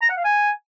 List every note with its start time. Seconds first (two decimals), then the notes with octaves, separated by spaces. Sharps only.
0.02 A#5
0.09 F#5
0.17 F5
0.25 G#5